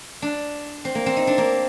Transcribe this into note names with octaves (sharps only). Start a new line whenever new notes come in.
D4
C4
A#3
C4
D#4
D4
A#3